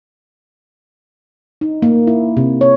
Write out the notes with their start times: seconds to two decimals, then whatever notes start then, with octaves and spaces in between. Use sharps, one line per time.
1.61 D#4
1.82 A#3
2.07 E4
2.37 C3
2.61 C#5